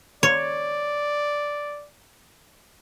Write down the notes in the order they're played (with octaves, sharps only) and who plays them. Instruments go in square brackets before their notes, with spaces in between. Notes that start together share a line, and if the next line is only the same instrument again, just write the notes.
[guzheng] C#5 [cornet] D5